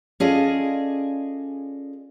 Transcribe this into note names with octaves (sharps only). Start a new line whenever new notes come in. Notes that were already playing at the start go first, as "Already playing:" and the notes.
C#4 F4 G#4 A4 D5 D#5